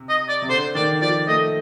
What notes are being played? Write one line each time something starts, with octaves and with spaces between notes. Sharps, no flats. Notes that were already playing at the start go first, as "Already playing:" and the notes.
Already playing: C3
D#5
D5
C3
D3 C5
D#3 D5
F3 D5
A3 D#5